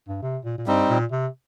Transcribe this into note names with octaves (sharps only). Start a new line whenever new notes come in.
G2
C3
A#2
A#2
G2 G3 C4 D#4
A#2
C3